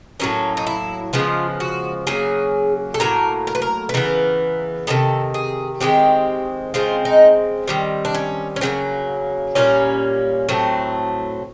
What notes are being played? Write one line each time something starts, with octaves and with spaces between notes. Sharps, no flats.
A2 F#3 A#3 C#4
D#4
E4
C#3 F3 G#3 B3 F4
F#4
C#3 F#3 A#3 G#4
A4
A2 F#3 A#3 A#4
A#4
B4
A#4
B4
C#3 E3 B3 A#4
C3 D#3 G#3 B3 A4
G#4
D#3 G#3 C4 G4
C#3 E3 G#3 C4 F4
D#4
D#3 G3 C4
D4
C#4
C#4
C#3 F#3 A#3 C4
A#2 G3 A#3 C#4
A2 F#3 A3 C4